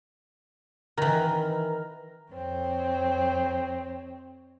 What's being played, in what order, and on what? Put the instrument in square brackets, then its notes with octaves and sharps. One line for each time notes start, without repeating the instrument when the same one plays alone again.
[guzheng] D#3 E3 [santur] A#4
[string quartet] F2 C4 C#5